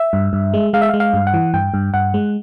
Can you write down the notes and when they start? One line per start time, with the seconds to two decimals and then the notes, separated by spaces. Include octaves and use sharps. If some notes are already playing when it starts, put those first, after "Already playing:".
Already playing: E5
0.13 G2
0.33 G2
0.54 G#3
0.73 G#3 F5
0.82 E5
0.89 F5
0.94 G#3
1.00 F5
1.13 G2
1.27 F#5
1.34 E3
1.54 G2 G5
1.74 G2
1.94 G2 F#5
2.14 G#3